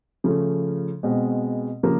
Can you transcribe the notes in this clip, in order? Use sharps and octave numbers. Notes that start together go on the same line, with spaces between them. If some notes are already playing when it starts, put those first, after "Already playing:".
C#3 F3 A3
B2 G#3 C4
C#3 F3 A#3